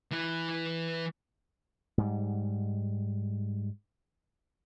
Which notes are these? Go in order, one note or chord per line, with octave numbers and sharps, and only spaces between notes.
E3 B4
G#2 G3